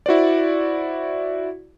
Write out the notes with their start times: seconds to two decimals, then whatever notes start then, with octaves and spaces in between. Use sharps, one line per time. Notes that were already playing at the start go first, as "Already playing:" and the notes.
0.06 E4 F#4 C5 D5